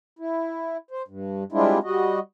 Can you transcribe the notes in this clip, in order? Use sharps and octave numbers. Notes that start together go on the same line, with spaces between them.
E4
C5
G2
G3 G#3 C4 D4 E4 F4
G3 F#4 D#5